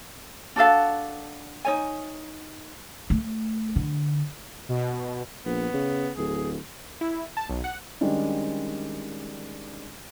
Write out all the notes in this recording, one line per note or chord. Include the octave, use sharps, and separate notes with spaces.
D4 F#4 A4 F5
D#4 C#5 G#5
A3
D3
B2
A#1 B3
C#3
D1 G#4
E4
A5
B1
F#5
D#3 G3 G#3 C#4 D4